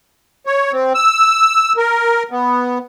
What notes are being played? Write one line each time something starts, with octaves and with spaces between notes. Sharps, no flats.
C#5
C4
E6
A#4
B3